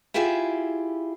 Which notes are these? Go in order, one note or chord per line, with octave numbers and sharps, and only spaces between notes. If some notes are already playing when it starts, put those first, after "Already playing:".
E4 F4 G4 G#4 E5